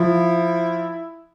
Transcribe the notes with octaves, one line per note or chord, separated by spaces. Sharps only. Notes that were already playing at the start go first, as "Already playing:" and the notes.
Already playing: F3 E4